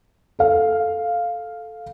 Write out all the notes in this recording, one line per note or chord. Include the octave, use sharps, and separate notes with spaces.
A4 F5